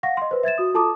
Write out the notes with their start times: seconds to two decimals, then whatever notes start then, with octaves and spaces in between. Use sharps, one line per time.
0.03 F5 F#5 C#6 A#6
0.17 D#5 C6
0.31 B4 C5
0.43 E5 G#6 A6 E7
0.58 F#4 D#6
0.74 F4 A4 A5 A#5 D6 D#6